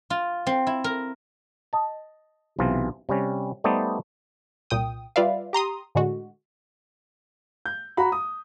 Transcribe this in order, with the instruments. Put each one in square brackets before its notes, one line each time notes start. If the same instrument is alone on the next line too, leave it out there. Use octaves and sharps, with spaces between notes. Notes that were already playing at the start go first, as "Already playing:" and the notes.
[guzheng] F4
C4
E4
A#4
[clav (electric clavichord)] D#5 A5
B1 C3 E3 F4
C3 G3 C#4
G3 A3 B3 D#4 C5 D5
[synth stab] C2 A#2 G5 D#6
G3 F4 B4 D5 E5 F5
G4 A#5 C6 D#6
A2 D3 G#3 F#4
[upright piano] G6
F#4 A#5 B5
D#6